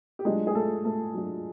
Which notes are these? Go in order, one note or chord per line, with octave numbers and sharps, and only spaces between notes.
G4
F#3 G#3 A3 D4 F4 G#4
G#4
A3 A4
A3 A4
F#3 A3 D4 F4